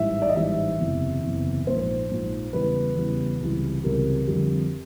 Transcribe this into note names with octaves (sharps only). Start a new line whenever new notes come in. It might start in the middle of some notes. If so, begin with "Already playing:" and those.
Already playing: A1 G#2 E3 G3 E5
D5
D#5
A1 G#2 E3 G3 E5
F#1 E2 C3 E3
F#1 E2 C3 E3
A#1 G#2 F3 C5
A#1 G#2 F3
E2 C#3 E3 G3 B4
E2 C#3 E3 G3
C#2 C3 E3 G3
C#2 C3 E3 G3 A#4
F2 D3 G3